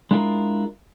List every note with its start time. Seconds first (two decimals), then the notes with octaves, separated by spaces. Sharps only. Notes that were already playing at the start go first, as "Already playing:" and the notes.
0.11 G#3 D4 E4 F4 G4 A#4